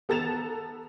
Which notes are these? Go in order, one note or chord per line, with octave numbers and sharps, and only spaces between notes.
B3 A4 A#5 A6 E7 F7